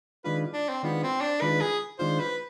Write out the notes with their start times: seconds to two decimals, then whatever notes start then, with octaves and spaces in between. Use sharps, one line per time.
0.24 D#3 G#3 D4 F4 B4
0.53 D4
0.69 C4
0.83 D#3 G#3 B3 D4 F4
1.03 C4
1.21 D4
1.41 D#3 G#3 D4 F4 B4
1.61 G#4
1.99 D#3 G#3 D4 F4 C5
2.19 B4